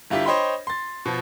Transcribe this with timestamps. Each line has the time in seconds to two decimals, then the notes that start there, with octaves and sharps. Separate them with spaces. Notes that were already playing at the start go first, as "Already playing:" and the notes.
0.10 G1 E4 F4 G4
0.26 C5 C#5 D#5 G5 B5 C6
0.67 C6 A6
1.05 B2 F3